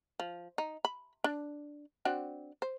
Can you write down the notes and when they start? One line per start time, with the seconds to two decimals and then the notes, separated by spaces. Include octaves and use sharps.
0.20 F3
0.58 D#4
0.85 B5
1.24 D4
2.05 C4 D4 F#4
2.62 C5